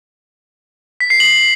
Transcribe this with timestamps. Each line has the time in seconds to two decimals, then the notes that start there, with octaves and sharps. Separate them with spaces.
1.00 B6
1.10 C7
1.20 F#7